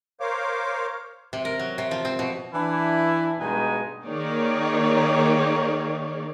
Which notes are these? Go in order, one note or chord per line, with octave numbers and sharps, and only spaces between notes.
A#4 C5 C#5 F5 D6
C3
A#4
F#3
C3
F3
C4
B2
E3 D4 E4
G2 B2 G#3 B3 D#4 G#5
D#3 A#3 D#4 G#4 C#5 D5